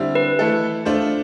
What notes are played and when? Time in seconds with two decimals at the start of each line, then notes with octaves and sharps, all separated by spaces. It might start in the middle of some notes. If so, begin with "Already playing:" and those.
Already playing: D3 G3 C4 E4
0.15 B4
0.39 E3 A3 E4 A4
0.85 A3 D4 F4 C5